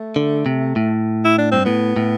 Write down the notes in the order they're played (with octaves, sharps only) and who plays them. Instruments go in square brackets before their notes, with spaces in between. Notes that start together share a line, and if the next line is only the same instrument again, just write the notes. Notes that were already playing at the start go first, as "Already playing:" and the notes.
Already playing: [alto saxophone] A3
[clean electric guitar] D3
C3
A2
[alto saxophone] E4
D4
[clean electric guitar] G2 [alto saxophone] C4
[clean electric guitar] A2 [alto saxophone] B3
[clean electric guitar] A2